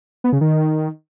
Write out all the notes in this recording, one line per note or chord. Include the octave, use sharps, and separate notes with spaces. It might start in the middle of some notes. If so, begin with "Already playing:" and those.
B3
C#3
D#3